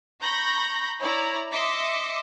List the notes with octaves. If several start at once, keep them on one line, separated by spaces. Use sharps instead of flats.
A#5 B5 C#6 G6 A#6
E4 C#5 D5 A#5
D#5 E5 C6 D6 B6 C#7